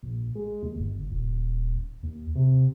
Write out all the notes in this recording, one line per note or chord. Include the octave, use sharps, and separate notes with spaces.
A#1
G#3
D#2
G1
D#1
D#2
C3